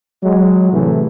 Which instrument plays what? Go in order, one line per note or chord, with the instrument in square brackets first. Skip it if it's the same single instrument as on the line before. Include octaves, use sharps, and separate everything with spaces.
[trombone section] F#3 G#3
A2 C3 E3 A3